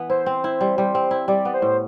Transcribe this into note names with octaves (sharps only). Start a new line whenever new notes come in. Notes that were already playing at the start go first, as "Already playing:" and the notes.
Already playing: E3 B3
E4 C5
C4
E4
G3
G3
C4
E4
G3 D5
B3
C5
A2